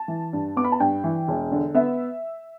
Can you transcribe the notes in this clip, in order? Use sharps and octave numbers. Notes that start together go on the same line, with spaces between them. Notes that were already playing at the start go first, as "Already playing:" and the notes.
Already playing: A5
E3
G2
B3 D6
B5
A5
G2 G5
E3
E1
D3
B3 E5